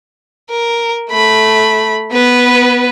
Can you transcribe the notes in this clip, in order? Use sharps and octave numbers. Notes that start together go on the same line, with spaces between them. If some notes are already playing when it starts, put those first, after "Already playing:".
A#4
A3 B5
B3 B4